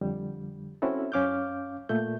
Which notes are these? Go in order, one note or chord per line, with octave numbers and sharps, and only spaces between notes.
F2 D3 G3
C4 C#4 E4 F#4 A4
F#2 C#4 F5 D6 F6 G6
A#2 A3 G6